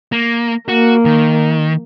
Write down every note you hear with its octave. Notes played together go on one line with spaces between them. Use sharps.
A#3
A#3 F#4
D#3